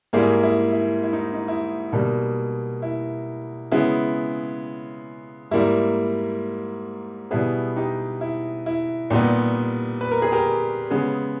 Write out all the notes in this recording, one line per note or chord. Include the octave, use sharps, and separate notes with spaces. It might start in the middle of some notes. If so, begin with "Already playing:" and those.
G#2 G3 A#3 E4 G#4
E4
E4
E4
D#4
D#4
E4
B2 G3 A#3 D#4
E4
C#3 G#3 B3 E4
G#2 G3 A#3 E4
B2 G3 B3 E4 G#4
D#4 G4
E4
E4
A#2 G3 B3 D#4 G4
B4
A#4
G#4
G4 A#4
C#3 G#3 B3